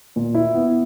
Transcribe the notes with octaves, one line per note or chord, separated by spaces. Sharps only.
A#2
E4
B3